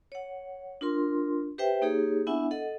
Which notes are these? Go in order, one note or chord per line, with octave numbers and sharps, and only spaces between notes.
C#5 F#5
D4 F4 A#4 C6
G4 B4 C5 E5 G5
A#3 D#4 G4 G#4 C#5
B3 D4 E4 E5 F#5 G#5
A4 D#5 F#5